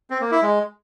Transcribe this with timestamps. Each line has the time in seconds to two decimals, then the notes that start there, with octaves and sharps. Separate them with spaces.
0.10 C4
0.21 A#3
0.32 E4
0.42 G#3